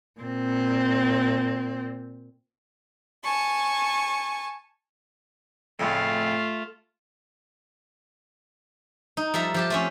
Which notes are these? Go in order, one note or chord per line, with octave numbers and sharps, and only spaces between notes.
A#2 C4
G#5 A5 C#6
F2 A2 C#3 A3 F4
D#4
F3 G3 A4 E5 A#5
F3 G4 A5
A3 C4 C#4